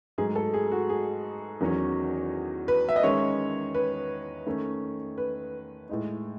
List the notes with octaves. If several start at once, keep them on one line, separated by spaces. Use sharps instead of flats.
G#2 F#3 A3 G#4
A4
G#4
F#4
G#4
E2 D#3 F#3 C#4
B4
E5
D#5
D#3 G#3 C#4 C#5
B4
D#3 A3 C#4
B4
A2 G#3 D#4